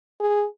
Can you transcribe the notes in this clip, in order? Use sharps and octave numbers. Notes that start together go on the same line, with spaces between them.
G#4